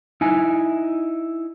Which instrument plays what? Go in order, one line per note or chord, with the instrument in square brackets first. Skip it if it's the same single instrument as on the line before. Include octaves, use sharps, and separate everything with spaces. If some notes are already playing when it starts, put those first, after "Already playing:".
[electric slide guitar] D#4 E4 G#5